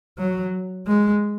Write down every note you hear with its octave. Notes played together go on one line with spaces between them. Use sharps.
F#3
G#3